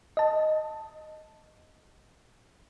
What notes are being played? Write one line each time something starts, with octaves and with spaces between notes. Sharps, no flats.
D#5 A5